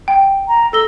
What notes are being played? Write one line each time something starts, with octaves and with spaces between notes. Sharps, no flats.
G5
A#5
A4 E6 A#6 G7